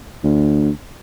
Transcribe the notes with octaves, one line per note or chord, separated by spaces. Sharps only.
D2